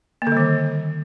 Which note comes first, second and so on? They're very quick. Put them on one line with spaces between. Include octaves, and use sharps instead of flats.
A#3 D3 G3 D#3